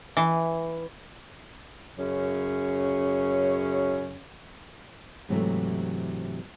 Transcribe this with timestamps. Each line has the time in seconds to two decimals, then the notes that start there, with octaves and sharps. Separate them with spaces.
0.17 E3
1.98 F#2 C#3 C#4 C#5
5.29 G#2 C3 E3 F#3 G3 A3